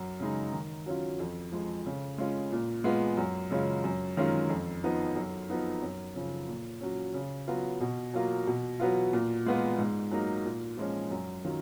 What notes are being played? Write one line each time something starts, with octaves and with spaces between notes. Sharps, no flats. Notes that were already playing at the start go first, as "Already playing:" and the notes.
Already playing: F#2
C#3 G#3 D#4
D#3
F#3 C#4 F4
F2
F3 G#3
C#3
G#3 C#4 F4
A#2
G#3 B3 F4
F#2
C#3 G#3 C#4 F4
F#2
D#3 G#3 C#4 F4
F2
F3 B3 D#4
F#2
F3 B3 D#4
F#2
C#3 F3
A#2
F#3 C#4
C#3
F#3 B3 F4
B2
F#3 A#3 F4
B2
F#3 B3 F4
A#2
G#3 B3 F4
G#2
F#3 A#3 D#4
A#2
F3 G#3 C#4
F#2
D#3 F#3 C#4 F4